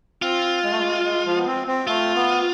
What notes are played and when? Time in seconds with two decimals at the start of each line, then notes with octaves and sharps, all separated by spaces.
0.22 C4 F4
0.64 G#3
0.72 A3
0.79 G#3
1.05 G#3
1.26 F3
1.36 B3
1.46 C4
1.67 C4
1.87 A3 F4
2.16 B3